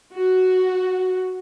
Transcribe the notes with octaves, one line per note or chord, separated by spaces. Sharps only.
F#4